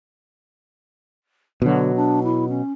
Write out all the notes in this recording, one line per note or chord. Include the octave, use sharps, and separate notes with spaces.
B2 D3 F#3
D4
E4
C#4